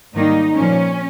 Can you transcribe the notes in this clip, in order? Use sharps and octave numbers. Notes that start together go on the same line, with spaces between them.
G#2 D#3 G3 A#3 D#4
A#2 F3 A#3 C#4